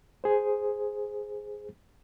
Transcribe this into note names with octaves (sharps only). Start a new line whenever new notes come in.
G#4 C5